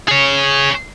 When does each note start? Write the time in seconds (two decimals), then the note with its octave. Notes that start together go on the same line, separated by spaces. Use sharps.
0.08 G#4 C#5